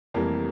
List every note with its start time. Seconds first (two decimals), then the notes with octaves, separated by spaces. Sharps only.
0.14 F1 F2 E3 G3 A#3